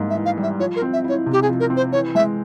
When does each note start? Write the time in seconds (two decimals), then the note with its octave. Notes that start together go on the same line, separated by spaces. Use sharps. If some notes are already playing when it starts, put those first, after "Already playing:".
Already playing: G#2 G3 A#3
0.10 E5
0.15 E3
0.25 F5
0.37 G3
0.43 E5
0.60 F3 C#5
0.76 A#4
0.82 C4
0.93 E5
1.04 E4 C#5
1.26 C3
1.33 G4
1.42 G#4
1.48 F3
1.60 A#4
1.70 C4
1.77 C5
1.92 E3 C#5
2.15 G#3 E5